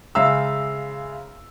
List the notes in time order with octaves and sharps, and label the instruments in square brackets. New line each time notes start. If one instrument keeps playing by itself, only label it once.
[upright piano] C#3 G#3 E5 F5 A#5 E6